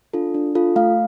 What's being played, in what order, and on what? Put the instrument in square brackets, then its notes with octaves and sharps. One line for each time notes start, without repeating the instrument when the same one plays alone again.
[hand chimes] D4 F4 A4
D4
F4 A4
A3 F5